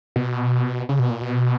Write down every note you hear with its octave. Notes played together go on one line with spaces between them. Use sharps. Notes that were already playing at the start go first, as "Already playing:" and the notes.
B2
C#3
B2
A#2
B2